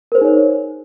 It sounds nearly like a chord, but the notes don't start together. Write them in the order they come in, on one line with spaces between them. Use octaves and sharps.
A#4 C5 G#4 D#4 C#5